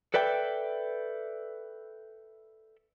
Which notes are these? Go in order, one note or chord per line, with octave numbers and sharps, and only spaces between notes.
A4 B4 D5 E5 G5